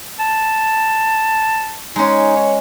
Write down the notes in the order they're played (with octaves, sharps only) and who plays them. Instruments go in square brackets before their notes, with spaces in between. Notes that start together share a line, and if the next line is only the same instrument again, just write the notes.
[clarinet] A5
[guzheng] G#3 C#4 [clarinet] D#4
[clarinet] C#5